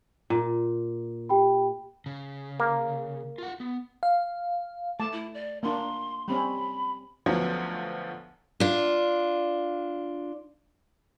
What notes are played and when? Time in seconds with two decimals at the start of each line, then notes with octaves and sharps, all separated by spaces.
0.30 A#2
1.29 G4 G5 B5
2.06 C#3
2.60 A#3
3.38 F4 F#5
3.60 B3
4.03 F5
5.00 A3 A5 D6
5.12 E4
5.34 D5
5.63 A#3 D4 C6
6.28 G3 C4 C#4 B5
7.26 D2 F3 F#3 B3 C#4
8.60 D4 F4